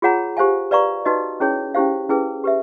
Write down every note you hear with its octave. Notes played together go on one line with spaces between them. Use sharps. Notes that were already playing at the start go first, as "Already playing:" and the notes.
F4 G#4 C#5 F#5 A#5
G4 C5 F5 G#5
B4 D5 F5 A#5 C#6
D#4 F#4 B4 D#5
C#4 E4 G#4 C#5
C#4 E4 G4 C5 F5
C#4 E4 G#4 B4
G4 B4 E5